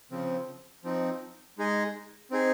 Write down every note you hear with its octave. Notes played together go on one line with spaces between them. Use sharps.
C#3 F3 C4
F3 C4 D#4
G#3 D#4 G#4 D#5
C4 D#4 G#4